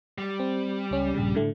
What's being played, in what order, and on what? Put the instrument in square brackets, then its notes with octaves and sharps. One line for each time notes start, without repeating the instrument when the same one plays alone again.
[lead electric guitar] G3
[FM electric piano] C4
C#2 C#4
A#1 G2 C#3
A2 D3 A3